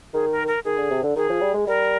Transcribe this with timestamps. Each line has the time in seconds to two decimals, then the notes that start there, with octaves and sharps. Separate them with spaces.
0.14 D#3 G#4
0.32 A#4
0.48 A#4
0.65 D#3 G#4
0.77 D3
0.90 C3
1.03 D3
1.16 D#3 G#4
1.30 F3
1.41 G3
1.54 G#3
1.67 G3 A#4